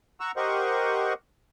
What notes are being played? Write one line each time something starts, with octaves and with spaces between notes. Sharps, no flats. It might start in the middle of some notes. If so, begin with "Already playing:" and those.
F#5 A#5 C#6 E6
G4 A#4 C5 D#5 F#5 C#6